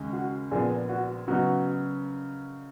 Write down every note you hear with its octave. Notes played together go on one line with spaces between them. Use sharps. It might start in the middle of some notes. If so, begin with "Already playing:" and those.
Already playing: D#2 C#3 G#3 D#4
F#4
A#1 A#2 F3 B3 G#4
F#4
C#3 F#3 B3 D#4 F#4